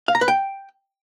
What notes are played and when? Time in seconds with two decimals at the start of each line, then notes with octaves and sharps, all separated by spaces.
0.08 F5
0.15 A#5
0.21 B4
0.28 G5